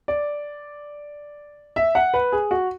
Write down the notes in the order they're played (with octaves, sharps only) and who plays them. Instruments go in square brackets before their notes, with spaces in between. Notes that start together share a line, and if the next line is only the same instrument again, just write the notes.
[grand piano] D5
E5
F#5
B4
G#4
F#4